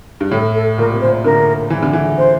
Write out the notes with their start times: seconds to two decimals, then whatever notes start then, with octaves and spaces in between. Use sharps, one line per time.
0.20 G2
0.31 A2 A4
0.55 A4
0.78 A#2 A#4
0.91 C3
1.01 C5
1.04 A#2
1.24 D3 A#4
1.70 E3
1.83 D3
1.93 E3
2.18 C5